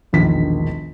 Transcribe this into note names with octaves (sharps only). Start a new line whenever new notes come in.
E1 A#1 D#3 B6